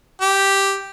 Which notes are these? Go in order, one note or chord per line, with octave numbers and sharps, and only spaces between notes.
G4